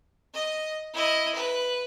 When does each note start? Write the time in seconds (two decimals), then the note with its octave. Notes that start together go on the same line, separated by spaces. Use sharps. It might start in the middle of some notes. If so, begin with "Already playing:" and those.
0.34 D#5
0.94 E4 D#5
1.35 B4